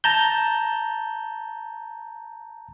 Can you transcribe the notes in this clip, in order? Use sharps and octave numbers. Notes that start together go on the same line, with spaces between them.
A5 A#5 G6